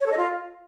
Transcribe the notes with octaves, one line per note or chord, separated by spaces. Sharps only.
C#5
A4
D#5
F4